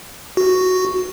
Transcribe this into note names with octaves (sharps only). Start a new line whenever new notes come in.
F#4